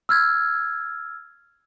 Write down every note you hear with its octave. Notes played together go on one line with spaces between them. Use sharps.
E6 F6 G#6